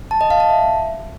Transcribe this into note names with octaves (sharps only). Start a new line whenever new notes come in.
A5
D#5
F5
A5
E5